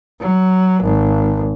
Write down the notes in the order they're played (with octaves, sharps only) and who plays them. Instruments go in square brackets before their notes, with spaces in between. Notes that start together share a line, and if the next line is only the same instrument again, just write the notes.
[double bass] F#3
G#1